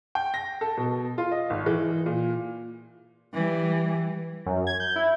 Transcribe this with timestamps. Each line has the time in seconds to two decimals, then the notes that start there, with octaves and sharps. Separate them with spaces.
0.15 G5
0.34 A#6
0.61 A4
0.77 B2
1.18 F4
1.32 D#5
1.50 G#1
1.66 E3
2.06 A#2
3.34 E3 G3
4.46 F#2
4.67 G#6
4.80 G6
4.96 E4